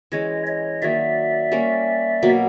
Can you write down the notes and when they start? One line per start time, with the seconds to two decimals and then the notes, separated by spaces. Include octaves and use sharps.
0.12 E3 G#3 C#4 C#5 D#5
0.47 C#5 D#5
0.82 D#3 F#3 A#3 D5 E5
1.52 G3 A#3 C#4
2.22 B2 F#3 A#3